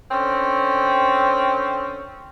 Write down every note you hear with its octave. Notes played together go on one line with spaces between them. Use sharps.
D3 C4 C#4